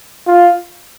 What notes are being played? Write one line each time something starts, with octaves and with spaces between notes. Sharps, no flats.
F4